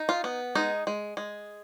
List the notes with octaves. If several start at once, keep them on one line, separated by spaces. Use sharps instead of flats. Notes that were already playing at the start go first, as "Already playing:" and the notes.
Already playing: D#4
F4
B3
G#3 D#4
G#3
G#3